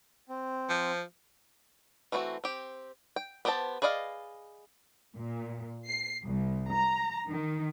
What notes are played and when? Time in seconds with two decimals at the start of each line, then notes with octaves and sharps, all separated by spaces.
0.29 C4
0.69 F3
2.12 E3 A3 C4 F4 F#4
2.44 C4 G4
3.16 G5
3.45 B3 G4 C5 D5 A5
3.82 G#4 B4 D5 D#5 F5
5.15 A#2
5.88 C7
6.23 C2
6.72 A#5
7.29 D#3